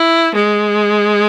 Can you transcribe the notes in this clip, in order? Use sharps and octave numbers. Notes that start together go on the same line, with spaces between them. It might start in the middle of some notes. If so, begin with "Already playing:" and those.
Already playing: E4
G#3